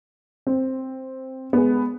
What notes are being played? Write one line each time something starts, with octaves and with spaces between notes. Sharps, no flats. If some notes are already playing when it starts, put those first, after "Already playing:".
C4
G#3 B3